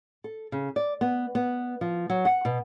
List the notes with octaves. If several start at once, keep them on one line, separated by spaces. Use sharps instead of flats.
A4
C#3
D5
B3
B3
F3
F#3
F#5
B2